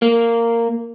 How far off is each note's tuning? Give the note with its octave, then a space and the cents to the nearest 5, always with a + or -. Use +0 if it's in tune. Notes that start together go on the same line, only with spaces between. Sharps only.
A#3 -10